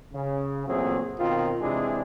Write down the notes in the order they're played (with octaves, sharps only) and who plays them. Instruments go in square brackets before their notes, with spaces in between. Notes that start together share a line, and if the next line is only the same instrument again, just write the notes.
[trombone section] C#3
A#2 E3 F#3 A3 C4 G#4
B2 D#3 C4 F4
C3 E3 G#3 D4 E4 G#4